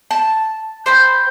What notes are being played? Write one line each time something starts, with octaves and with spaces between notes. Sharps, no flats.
A5
C5 G5 B5